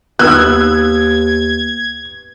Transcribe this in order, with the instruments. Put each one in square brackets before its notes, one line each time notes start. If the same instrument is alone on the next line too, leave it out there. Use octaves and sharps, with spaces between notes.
[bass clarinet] D#2 [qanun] B3 [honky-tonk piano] E6 F#6 [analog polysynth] G#6